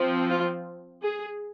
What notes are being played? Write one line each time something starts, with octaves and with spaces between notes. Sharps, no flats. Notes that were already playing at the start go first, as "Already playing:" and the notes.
Already playing: F3 C4
F4
G#4